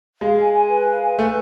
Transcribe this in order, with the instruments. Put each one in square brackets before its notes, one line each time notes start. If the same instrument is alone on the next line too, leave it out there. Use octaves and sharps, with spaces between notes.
[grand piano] G#3 [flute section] F5
[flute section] G#5
G#5
B4
F5
G#5
[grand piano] A3 [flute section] B4